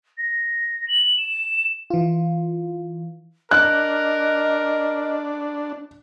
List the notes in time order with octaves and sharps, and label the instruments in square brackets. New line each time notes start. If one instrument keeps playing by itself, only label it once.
[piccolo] A#6
F#7
E7
[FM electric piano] E3 F4
[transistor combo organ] D4 [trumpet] A#4 [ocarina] D#5 [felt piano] F#6